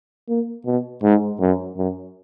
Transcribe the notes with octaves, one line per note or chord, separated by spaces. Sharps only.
A#3
B2
G#2
F#2
F#2